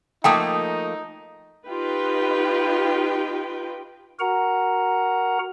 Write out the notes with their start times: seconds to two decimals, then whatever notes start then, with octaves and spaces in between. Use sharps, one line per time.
0.24 F3 A3 A#3 D#4 G5 A5 D#6
1.67 D#4 F4 G4 B4 G5
4.19 F#4 A#4 F#5 A#5